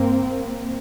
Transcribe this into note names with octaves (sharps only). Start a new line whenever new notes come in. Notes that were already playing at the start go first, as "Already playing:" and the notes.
Already playing: G2 A#3 C4